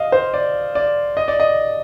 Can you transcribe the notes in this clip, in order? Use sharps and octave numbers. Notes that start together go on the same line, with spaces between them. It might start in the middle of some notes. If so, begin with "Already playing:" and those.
Already playing: D#5 F5
C5
D5
D5
D#5
D5
D#5